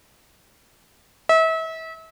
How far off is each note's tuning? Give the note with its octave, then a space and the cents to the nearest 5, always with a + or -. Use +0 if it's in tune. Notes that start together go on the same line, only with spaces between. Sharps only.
E5 -35